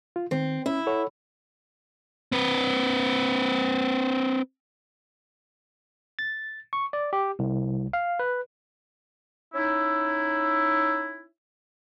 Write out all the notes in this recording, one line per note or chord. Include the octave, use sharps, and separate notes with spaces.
F4
D#3 C4
C#4 E4
A4 C#5 F#5
C4 B4
A6
C#6
D5
G4
C2
F5
B4
C#4 D#4 E4